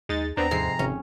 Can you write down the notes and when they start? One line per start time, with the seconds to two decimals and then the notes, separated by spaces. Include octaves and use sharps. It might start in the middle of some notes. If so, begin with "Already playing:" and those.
0.09 D#2 G#3 D#4 A6
0.37 D#2 B3 C4 D4 A#5
0.51 F2 G#2 C3 G#4 C7
0.79 G#1 C3 C#4